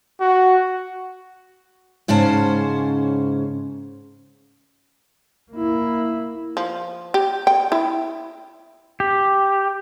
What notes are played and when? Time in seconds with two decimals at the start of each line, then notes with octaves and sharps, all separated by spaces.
0.20 F#4
2.08 G#2 C#3 C#4 C5 A5
5.52 A#3 E4
6.57 F3
7.14 G4
7.47 G5
7.72 E4
9.00 G4